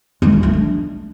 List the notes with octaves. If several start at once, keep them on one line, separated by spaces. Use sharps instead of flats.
G#3
F4
A3
D4